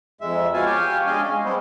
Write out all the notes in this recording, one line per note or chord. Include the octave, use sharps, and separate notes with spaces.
F2 G#3 E5
B3 F#4 F5 G#5 A5
G4 C#5 F5 G5 G#5
G#3 D4 D#5 F5 G#5
C#4
G3 G#3 B3 C4